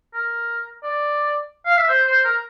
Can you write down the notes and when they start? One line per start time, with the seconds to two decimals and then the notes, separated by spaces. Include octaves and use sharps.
0.14 A#4
0.83 D5
1.66 F5
1.77 E5
1.89 C5
2.07 C5
2.24 A#4